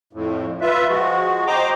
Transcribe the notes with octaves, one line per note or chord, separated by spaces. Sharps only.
F2 A2
F4 B4 E5
F3 G#3 F#4
C5 D#5 G5 A#5 D6